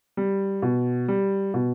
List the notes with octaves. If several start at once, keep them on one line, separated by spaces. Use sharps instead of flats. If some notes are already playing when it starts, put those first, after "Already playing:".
G3
B2
G3
B2